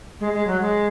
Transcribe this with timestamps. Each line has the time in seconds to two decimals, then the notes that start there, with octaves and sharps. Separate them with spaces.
0.20 G#3
0.33 G#3
0.47 F#3
0.61 G#3